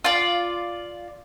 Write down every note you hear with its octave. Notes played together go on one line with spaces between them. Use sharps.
F4 D5